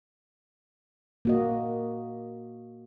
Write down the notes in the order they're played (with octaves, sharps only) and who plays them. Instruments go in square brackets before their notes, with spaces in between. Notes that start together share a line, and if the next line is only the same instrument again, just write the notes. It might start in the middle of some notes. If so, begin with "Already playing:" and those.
[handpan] A#3 F#4 D#5